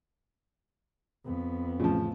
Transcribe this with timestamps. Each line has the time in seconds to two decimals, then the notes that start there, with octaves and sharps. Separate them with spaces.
1.25 F2 B3
1.79 A1 C#3 F3 F4